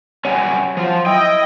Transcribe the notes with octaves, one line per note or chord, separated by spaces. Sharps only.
F#3 G3 C#4 C#5 F#5 G#5
F3 F#3 F4
E4 D#5 G5